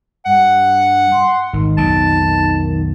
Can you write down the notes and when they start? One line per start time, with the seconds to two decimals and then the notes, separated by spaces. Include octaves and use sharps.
0.25 G2 F#5
1.12 C6
1.53 G#1 D#3
1.77 B1 F2 B2 A5